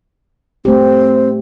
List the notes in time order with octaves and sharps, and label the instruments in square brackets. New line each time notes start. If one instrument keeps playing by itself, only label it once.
[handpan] A3 G4 [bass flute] C4